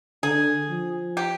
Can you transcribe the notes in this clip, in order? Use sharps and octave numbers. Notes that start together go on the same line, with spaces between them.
D3 G#4
F3
G4